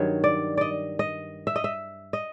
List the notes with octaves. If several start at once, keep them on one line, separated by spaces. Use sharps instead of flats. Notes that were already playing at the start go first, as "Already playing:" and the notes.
Already playing: G2 D#3 F#3 C#5
D5
D5 D#5
D#5
E5
D#5
E5
D#5